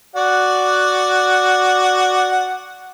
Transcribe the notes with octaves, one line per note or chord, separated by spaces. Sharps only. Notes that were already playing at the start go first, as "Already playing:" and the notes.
F#4 D5 F#5